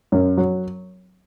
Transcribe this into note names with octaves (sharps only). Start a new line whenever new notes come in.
F#2
F#3